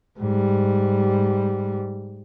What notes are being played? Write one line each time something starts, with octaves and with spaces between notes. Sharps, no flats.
G#2 G3